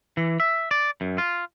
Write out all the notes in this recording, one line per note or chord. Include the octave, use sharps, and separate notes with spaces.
E3
E5
D5
F#2
F4